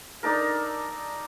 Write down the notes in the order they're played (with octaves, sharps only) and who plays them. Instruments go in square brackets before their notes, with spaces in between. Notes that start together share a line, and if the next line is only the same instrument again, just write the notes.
[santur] D4 D#4 A4 A#4